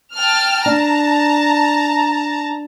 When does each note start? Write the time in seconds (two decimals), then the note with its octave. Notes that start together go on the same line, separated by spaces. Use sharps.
0.14 G5 A5 F6
0.66 D4 A5 A#5